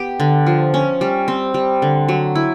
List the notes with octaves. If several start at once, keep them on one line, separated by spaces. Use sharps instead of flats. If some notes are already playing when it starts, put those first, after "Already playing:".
Already playing: B3 G4
D3
F3
C#4
G3
C4
G3
D3
F#3
E4